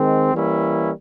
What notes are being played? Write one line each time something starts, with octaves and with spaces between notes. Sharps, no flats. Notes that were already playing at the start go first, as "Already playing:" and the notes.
Already playing: D#3 G#3 C4
E3 G3 A#3 C#4 E4